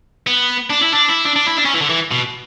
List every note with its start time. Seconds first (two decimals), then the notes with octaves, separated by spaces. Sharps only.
0.27 B3
0.70 D4
0.82 E4
0.92 D4
1.09 E4
1.25 D4
1.36 D4
1.47 E4
1.57 D4
1.65 C#4
1.74 E3
1.82 D3
1.90 E3
2.12 B2